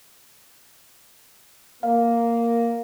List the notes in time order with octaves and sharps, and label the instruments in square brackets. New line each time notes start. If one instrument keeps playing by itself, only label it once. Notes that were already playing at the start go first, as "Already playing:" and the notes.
[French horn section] A#3 [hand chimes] F5